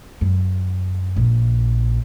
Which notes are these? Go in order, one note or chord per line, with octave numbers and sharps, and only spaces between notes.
F#2
A#1